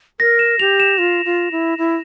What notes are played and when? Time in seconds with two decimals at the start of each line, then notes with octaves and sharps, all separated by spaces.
0.20 A#4 A#6
0.39 E7
0.59 G4 F7
0.80 E7
0.98 F4
1.25 F4
1.52 E4
1.78 E4